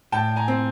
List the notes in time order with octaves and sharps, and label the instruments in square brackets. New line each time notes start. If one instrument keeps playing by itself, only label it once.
[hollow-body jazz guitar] A2 [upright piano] G5 A5
[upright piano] G#5 A#5
[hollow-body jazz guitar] C4